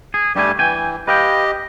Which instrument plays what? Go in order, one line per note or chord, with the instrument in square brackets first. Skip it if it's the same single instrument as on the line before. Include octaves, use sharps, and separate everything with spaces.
[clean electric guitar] G#4
[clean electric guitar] G2 A3 G#5 [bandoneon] G3 G4
[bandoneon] E3 [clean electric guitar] G5 G#5
[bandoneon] G4 D#5 [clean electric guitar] B4 F5 G5